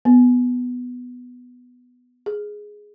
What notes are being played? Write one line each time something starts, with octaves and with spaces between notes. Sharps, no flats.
B3
G#4